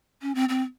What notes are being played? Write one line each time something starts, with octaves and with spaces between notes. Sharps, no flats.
C#4
C4
C4